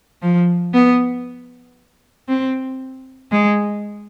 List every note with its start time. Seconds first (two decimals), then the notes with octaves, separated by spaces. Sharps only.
0.22 F3
0.74 B3
2.28 C4
3.32 G#3